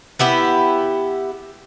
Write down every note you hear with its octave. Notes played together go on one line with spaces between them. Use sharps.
B3 E4 G4